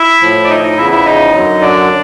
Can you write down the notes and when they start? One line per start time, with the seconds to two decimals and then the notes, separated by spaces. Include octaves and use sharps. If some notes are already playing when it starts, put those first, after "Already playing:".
Already playing: E4 E5
0.22 A2 F3
0.44 D5
0.49 D#4 D#5
0.63 D#4 D#5
0.77 E2 C#3 F3 E4 E5
0.92 E4 E5
1.05 D#4 D#5
1.34 F#2 D3 F#3
1.62 D4 D5